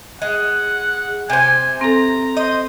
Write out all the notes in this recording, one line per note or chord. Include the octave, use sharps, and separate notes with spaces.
G#3 F#5
C3 C5 G#5
C4 A4 A#5
C5 D#5